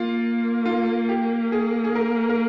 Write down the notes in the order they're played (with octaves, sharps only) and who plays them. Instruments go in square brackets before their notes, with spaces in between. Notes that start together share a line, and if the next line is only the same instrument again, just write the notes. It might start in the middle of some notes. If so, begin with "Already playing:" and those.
Already playing: [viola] A#3 [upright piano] F4
[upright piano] F4
G4
G#4
G#4
A#4
A#4